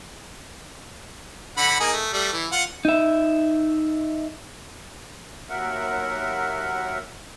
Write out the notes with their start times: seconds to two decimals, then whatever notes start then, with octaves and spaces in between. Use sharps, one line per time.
1.57 D3 F#5 B5
1.80 A#3 D#4 G#4
1.93 A3
2.13 G3 A3
2.33 E3
2.52 F4 F#5
2.85 D#4 E5
5.49 D#2 F#3 A#4 E5 F#5